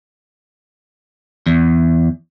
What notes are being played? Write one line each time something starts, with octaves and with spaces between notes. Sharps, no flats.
E2